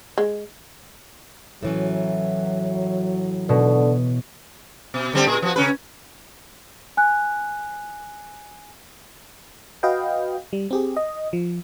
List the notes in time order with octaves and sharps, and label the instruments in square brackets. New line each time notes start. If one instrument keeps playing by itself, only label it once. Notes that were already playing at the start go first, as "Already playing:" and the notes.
[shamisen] G#3
[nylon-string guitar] A2 E3 C#4 [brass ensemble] F#3
[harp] B2 [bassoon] D3
[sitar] B2
D3 G3 C4
A#2 G#4
F3 F#4
C#3 C#4 B4
[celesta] G#5 F#6
[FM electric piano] F#4 B4 D#5 F5 G5
G3
C4 G4 G#4
D#5
F3